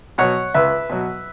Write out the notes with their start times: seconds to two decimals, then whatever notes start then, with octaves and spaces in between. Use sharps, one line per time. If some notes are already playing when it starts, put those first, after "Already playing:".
0.18 B2 F#3 C#5 F#5
0.54 C#2 B4 E5
0.90 B2 F#3